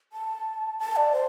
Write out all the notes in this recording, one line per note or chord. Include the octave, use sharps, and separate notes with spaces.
A5
A5
D5
C5